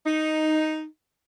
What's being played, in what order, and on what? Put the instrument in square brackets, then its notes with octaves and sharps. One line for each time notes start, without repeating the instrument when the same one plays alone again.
[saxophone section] D#4